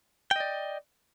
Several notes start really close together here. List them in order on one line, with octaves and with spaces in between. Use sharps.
G5 D#5 D5